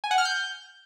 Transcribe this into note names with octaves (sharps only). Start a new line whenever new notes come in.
G#5
F#5
F6
G6